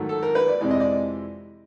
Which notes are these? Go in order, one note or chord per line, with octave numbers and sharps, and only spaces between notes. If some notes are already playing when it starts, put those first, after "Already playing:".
Already playing: G#2 D#3 F#3 A3
A4
A#4
B4
D5
F2 C3 E3 G#3 D5
D#5
D5